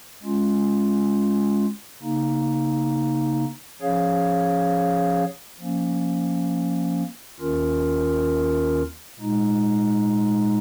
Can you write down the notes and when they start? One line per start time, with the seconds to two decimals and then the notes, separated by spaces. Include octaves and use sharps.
0.23 G#3 C#4 F4
2.02 C#3 A#3 D#4
3.82 F3 C#4 G#4 C#5 F5
5.60 F3 A#3 C#4
7.40 D#2 D#3 C#4 F4 A#4
9.19 A#2 G#3 D#4